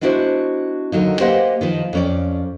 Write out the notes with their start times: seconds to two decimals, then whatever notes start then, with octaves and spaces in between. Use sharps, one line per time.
0.01 G#3 B3 D4 E4 F#4 C5
0.92 D#2 D3 F#3 D#4
1.20 A#3 G4 B4 C5 D#5 F#5
1.61 D#3 F3 B4
1.93 F2 C#4 D5